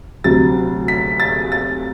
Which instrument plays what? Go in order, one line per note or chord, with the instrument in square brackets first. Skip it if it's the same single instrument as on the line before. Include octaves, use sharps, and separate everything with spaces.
[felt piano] D2 C3 F#3 [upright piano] A6
[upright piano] B6
A6
A6